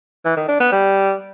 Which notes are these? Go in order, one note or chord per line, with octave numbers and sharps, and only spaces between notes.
E3
D#3
D4
B3
G3